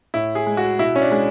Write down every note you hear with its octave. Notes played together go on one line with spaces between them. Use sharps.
A2 E4
G#4
G#3
F#4
B2 E4
C#4
D4
G#3